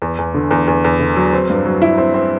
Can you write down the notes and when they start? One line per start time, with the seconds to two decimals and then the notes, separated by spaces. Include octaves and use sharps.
0.02 E2
0.18 E2
0.34 D3
0.51 E2
0.68 E2
0.84 E2
1.00 D3
1.16 F#3
1.33 C4
1.50 G2
1.66 F#3
1.82 E4
1.98 C4
2.14 C4